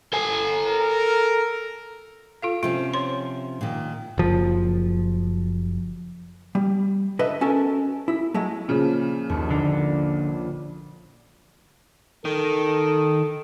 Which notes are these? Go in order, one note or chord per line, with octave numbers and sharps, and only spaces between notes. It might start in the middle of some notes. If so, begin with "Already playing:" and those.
A4 G#5
A#4
F4 A4 F5
C3 F3 C#4 F4
C5 C#5 C6
A#2 D#3
F#1 F3
G3
D3 B4 D#5 E5
C#4 F#4 A4 A#4
E4
F#3 G#3 A3
A#2 C#3 F3
D#1 A#1 D#2
D3 D5
D#3 A4